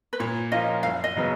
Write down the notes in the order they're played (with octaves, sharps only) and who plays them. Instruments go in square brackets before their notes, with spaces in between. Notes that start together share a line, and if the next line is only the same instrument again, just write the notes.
[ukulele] B4
[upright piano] A#2 [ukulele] C#5
[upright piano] F3 A#3 C#4 F4 [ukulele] D#5
[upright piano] F#1 [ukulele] F5
[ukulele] D#5
[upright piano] C#3 F#3 B3